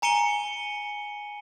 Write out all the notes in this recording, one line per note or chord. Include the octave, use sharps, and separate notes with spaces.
G#5 A#5 C#7 D#7 G7